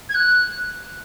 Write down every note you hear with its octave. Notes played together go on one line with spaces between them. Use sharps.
G#6
F#6